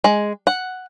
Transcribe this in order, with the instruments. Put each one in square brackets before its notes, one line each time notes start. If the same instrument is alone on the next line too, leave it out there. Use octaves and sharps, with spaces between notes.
[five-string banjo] G#3
F#5